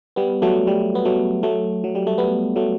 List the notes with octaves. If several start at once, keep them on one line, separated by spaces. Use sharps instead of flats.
G3 B3
F#3 A3
G3
B3
F#3 A3
F#3 A3
F#3
G3
A3
G3 B3
F#3 A3